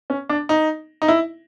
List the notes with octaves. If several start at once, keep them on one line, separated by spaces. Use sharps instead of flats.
C#4
D4
D#4
D#4
E4